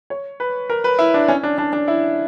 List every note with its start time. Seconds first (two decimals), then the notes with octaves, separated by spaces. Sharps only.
0.10 C#5
0.40 B4
0.70 A#4
0.84 B4
0.99 E4
1.14 D4
1.28 C#4
1.43 D4
1.58 D4
1.73 D4
1.88 E4